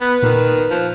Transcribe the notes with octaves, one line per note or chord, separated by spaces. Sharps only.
B3 B4
A#2 D#3 A#3
F3